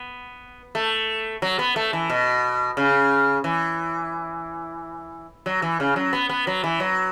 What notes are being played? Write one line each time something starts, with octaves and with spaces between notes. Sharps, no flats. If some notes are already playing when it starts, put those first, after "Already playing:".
Already playing: B3
A3
F#3
B3
A3
E3
B2
C#3
E3
F#3
E3
C#3
F#3
B3
B3
F#3
E3
F#3